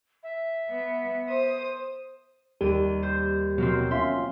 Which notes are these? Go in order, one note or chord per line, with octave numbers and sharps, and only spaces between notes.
E5
B3
C5 D#6
D#2 G3 G4 D#7
C5
B2 F#3 A#3 C4
C#4 F4 E5 F5 C6